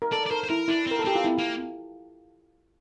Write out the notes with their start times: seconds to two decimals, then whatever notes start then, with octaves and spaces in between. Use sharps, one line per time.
0.02 A#4
0.12 A4 D5
0.26 D5
0.31 A#4 C5
0.44 C5
0.49 E4 A#4
0.68 D4 E4
0.87 C4 A#4
0.99 A4
1.05 C4 G4
1.15 F4
1.24 E4
1.39 A#3